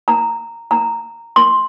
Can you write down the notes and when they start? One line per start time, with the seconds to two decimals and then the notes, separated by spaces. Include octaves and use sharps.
0.08 A#5
0.71 A#5
1.36 C6